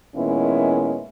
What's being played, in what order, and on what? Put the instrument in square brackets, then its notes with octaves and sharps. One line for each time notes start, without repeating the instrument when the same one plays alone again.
[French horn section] A#2 D#3 G#3 B3 C#4 E4